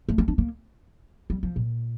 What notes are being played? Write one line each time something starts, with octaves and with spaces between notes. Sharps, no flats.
A3
C#4
D4
A#3
G3
F3
A#2